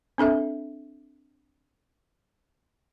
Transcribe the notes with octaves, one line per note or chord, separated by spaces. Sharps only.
C4 D4 A4 E5